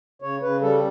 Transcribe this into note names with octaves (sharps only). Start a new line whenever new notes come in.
C#3 C#5
C#3 B4
G3 A4